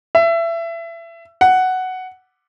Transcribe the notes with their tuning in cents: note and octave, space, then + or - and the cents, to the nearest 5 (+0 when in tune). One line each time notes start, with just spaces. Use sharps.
E5 +25
F#5 +5